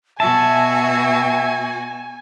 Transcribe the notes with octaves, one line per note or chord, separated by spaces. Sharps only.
B2 F#4 E5 G#5 A5